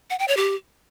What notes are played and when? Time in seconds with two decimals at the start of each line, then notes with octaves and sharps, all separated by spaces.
0.10 F#5
0.19 G5
0.28 C#5
0.37 G4